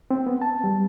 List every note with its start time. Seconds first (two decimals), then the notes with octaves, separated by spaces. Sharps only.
0.11 C4
0.27 B3
0.42 A5
0.64 G3